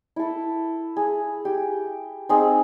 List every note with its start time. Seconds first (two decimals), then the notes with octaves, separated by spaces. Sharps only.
0.16 E4 A4
0.96 G#4
1.45 G4
2.29 C4 D#4 G#4